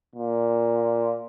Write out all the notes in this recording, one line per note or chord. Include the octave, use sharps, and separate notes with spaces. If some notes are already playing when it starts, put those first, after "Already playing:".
A#2